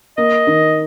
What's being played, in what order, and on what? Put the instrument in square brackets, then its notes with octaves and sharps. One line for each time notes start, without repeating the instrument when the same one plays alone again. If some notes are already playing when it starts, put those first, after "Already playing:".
[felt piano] A#3 [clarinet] D#5
[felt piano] D#3